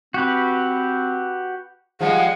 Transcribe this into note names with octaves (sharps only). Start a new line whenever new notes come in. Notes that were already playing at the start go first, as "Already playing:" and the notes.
C4 F#4 G4 B4
F3 G3 G#3 G#4 F#5